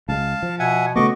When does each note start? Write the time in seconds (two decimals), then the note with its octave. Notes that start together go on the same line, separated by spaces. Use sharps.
0.09 C#2 G#3 F5 A5
0.42 F3
0.59 B2 E5 F#5 G#5
0.96 C#3 A3 B3 F#4 D#5 C#6 D6